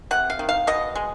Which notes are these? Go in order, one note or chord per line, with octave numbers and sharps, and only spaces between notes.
C3 F#5
F5
D#3
F5
B2 D#5
G#3